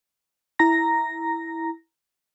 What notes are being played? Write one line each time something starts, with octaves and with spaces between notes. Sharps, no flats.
E4 A#5 A#6